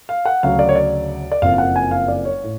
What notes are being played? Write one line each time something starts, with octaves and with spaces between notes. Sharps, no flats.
F5
F#5
D2 C#3 F#3 F5
D5
C#5
D5
D5
F#1 F2 F3 F5
F5
F#5
G#5
F5
D5
C#5
A2